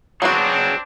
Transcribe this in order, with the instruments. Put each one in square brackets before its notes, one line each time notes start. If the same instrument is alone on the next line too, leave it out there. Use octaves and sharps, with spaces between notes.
[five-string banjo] F#3 B3 F#4 [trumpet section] C4 D4 [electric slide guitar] G#4 C#5 F#5